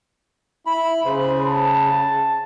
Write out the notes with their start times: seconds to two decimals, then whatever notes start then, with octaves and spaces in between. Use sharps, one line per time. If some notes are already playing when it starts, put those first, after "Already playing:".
0.66 E4 B5
1.05 C#3 C5
1.47 A5